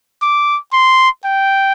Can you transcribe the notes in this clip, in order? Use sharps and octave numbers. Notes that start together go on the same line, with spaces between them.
D6
C6
G5